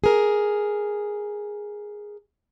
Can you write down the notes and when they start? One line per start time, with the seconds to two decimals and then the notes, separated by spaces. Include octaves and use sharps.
0.04 G#4 A#4